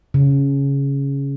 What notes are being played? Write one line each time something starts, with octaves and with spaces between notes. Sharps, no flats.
C#3